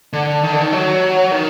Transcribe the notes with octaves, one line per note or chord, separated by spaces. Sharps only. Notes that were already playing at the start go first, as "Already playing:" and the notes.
D3
D#3
D3
D#3
F#3
D#3